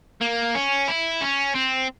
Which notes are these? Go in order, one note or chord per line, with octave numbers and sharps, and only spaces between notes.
A#3
C#4
E4
C#4
C4